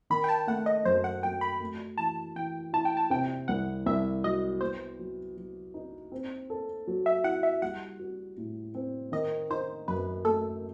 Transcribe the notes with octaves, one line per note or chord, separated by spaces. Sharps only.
D#3 B5
G5
A5
A3 F#5
D#5
F#2 C5
F#5
F#3 G5
B5
A3
E3 A5
E3 G5
E4 A5
G5
A5
C3 G5
C2 F#5
C2 E5
F#3 D#5
B3 C5
F#3
F#3
D#4
C4
A4
F#3
E5
E4 F#5
E5
G3 F#5
F#4
A2
C4
D#3 D#5
D#4 C5
F#2 B4
A3 A4